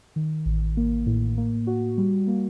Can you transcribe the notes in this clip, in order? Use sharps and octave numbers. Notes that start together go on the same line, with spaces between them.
D#3
A1
A#3
A2
A#3
F#4
G3
A#3